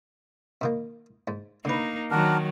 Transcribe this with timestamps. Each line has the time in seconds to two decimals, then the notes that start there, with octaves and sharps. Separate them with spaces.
0.61 B2 D#3 A#3
1.28 G#2
1.65 D3 A#3 D#4 B4
2.11 D#3 F#3 D4 F#4 A#4